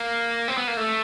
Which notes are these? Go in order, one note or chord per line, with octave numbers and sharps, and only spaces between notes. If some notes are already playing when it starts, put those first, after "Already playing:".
Already playing: A#3
C4
B3
A#3
A3